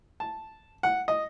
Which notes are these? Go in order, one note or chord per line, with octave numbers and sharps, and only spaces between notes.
A5
F#5
D#5